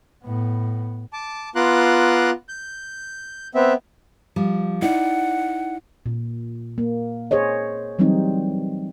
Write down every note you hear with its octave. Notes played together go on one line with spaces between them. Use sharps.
A2 B3
A5 D6
B3 F4 A#5 C6 D6 F#6
G6
B3 C4 E5
F3 G3
D#4 E4 D5 F#5
A#2
A#3
G#4 C5 C#5 D#5
E3 F#3 G3 C4 D#4